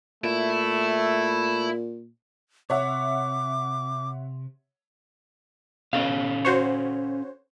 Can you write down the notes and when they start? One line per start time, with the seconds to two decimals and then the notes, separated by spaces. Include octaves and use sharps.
0.24 A#2 A3 E4
2.70 C3 C#5 E5 F#5 D6
5.93 B2 C#4 A4 F5
6.45 F#4 C5 C#5